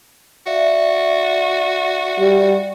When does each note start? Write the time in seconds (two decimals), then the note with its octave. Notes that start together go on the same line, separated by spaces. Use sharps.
0.47 F#4 D5 E5 F5
2.20 G3